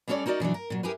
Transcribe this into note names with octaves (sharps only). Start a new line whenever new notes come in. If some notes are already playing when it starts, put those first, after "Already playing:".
G3 G#3 C#4 A4 C#5 D5
D#4 F#4 A#4 B4 D5 D#5
B2 E3 F#3 D4
A#4
A#2 F#3
E4 G4 G#4 A#4 B4